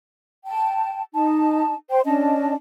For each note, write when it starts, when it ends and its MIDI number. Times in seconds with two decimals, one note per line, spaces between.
0.46 1.02 79
0.46 1.02 81
1.14 1.75 63
1.14 1.75 81
1.90 2.00 72
1.90 2.00 79
2.05 2.54 61
2.05 2.54 62
2.05 2.54 75
2.05 2.54 81